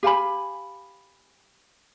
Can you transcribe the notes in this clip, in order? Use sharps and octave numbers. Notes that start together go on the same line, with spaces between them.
G4 F5 G#5 B5